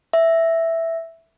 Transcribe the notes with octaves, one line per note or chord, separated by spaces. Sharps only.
E5